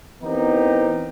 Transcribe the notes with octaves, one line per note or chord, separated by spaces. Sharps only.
E3 B3 C4 D#4 G4 A#4